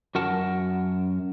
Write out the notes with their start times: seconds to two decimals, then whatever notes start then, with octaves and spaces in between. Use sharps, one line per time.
0.15 F#2 F#4 A#4 F#5 A5